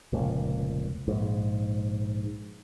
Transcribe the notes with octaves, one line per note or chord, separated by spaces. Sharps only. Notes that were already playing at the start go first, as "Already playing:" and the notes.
F1 C#2 A#2
A#1 G#2